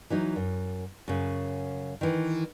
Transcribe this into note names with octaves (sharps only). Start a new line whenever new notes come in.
E3 F#3 D#4
F#2
F#2 C#3
D#3 E3